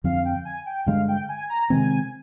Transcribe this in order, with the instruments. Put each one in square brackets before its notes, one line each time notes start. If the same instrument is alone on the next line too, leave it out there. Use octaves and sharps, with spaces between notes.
[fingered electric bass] F2 D3 F3 C4 [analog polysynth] F5
[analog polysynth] G5
G#5
G5
[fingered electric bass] G2 D3 G#3 [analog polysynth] F5
[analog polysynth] G5
G#5
A#5
[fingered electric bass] C3 D#3 G#3 C4 [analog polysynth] G#5